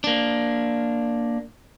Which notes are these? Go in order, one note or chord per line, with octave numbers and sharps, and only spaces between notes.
A#3 D4